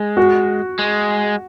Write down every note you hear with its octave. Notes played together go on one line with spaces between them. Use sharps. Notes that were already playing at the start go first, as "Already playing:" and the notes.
Already playing: G#3
F#4
G#3